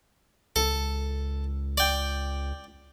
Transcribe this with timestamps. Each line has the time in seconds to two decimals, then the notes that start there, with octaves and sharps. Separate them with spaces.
0.56 C#2 A4
1.78 D5 G5